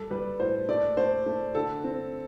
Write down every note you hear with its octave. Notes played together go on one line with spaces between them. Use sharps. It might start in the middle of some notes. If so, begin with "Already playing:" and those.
Already playing: G3 A4
G3 B4
A2 C5
A3 D5
A3 C5
A3
D3 A4
C4